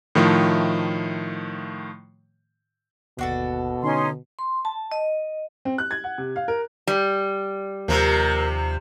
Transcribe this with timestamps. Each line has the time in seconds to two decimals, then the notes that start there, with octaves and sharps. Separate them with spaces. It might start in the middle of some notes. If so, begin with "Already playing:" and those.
0.15 A2 D#3 F3 A3
3.19 G1 D#2 B2 D4 F#4 A4
3.83 D3 C#4 D#4 C6
4.39 C6
4.65 A5
4.92 D#5
5.65 C4
5.78 F#6
5.91 G#6
6.04 F#5
6.18 C3
6.36 F5
6.48 A#4
6.87 G3
7.88 D#2 C3 F3 A#4